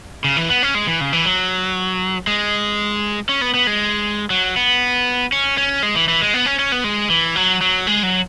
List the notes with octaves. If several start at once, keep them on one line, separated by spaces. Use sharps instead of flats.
C#3
E3
B3
C#4
G#3
E3
C#3
E3
F#3
G#3
C#4
B3
B3
G#3
F#3
B3
C#4
C#4
G#3
E3
E3
G#3
B3
C#4
C#4
B3
G#3
E3
F#3
F#3
G#3
F#3